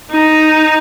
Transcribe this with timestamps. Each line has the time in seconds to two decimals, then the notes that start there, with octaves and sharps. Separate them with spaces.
0.11 D#4